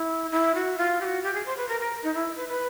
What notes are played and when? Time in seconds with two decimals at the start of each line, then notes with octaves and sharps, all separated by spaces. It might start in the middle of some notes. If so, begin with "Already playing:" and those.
Already playing: E4
0.32 E4
0.55 F#4
0.78 F4
1.01 G4
1.04 F#4
1.23 G4
1.34 G#4
1.45 C5
1.57 B4
1.68 A#4
1.80 A#4
2.03 D#4
2.14 E4
2.36 B4
2.49 B4